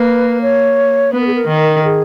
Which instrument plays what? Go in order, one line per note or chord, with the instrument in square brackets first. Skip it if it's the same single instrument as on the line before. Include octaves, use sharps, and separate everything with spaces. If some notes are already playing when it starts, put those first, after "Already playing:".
Already playing: [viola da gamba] A#3 [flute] B4
[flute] C#5
[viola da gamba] B3 [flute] B4
[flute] A#4
G#4
A#4
[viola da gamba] D#3
[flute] G#4